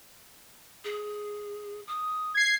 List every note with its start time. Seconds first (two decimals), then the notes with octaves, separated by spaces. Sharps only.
0.84 G#4
1.87 D#6
2.34 G#6 C7